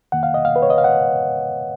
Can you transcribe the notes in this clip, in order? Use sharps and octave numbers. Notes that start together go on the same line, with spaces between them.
F2 D#3 A#3 F#5
F5
D#5
F5
B4
C#5
D#5
F5
F#5